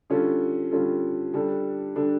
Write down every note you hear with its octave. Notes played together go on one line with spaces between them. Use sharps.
D3 G3 C#4 F4 A4
D3 G3 C#4 F4 A4
D3 G3 D4 A4
D3 G3 D4 A4